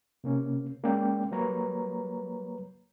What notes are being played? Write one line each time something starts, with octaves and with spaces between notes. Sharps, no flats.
C3 A#3 C#4
G#3 A#3 C#4 D5 G5
F#3 G3 A#3 B4 C#5 A#5